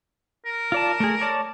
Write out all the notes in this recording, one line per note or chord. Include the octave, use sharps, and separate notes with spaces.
A#4
F4 D5 A5
A3 G#4
C#5 D5 A5